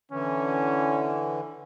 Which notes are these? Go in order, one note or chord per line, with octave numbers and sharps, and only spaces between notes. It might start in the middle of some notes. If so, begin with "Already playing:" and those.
D3 E3 C#4